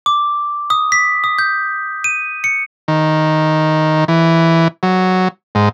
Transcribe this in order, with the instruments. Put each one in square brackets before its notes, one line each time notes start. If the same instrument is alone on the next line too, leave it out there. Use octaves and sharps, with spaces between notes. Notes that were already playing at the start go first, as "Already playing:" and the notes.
[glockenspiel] D6
D#6
B6
D#6
G6
D#7
C#7
[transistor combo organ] D#3
E3
F#3
G#2